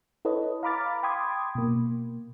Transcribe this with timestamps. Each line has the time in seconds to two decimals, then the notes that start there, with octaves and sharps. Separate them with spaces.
0.25 E4 A4 B4 C#5 D#5
0.63 F5 A#5 B5 D6 F6 A6
1.03 G5 B5 C6 D6 D#6 G#6
1.55 B2 A#3